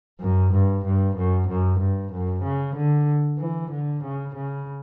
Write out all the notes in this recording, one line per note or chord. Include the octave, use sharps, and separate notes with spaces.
F#2
G2
G2
F#2
F#2
G2
F#2
C#3
D3
E3
D3
C#3
C#3